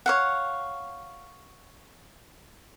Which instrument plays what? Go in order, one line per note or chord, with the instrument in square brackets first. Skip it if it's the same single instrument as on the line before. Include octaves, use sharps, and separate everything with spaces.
[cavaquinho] C#5 F5 F#5